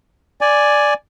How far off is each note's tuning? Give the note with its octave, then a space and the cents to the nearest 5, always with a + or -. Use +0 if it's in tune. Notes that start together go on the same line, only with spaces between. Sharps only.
D5 +0 G#5 +5